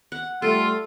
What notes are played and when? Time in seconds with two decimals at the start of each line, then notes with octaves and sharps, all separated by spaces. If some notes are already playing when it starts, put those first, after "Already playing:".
0.12 F#5
0.42 G3 A3 F4 A4